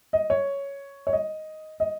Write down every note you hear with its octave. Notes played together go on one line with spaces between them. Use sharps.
D#5
C#5
C#5
D#5
D#5